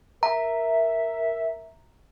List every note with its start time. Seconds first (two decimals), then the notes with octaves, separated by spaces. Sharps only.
0.23 A#4 E5 A#5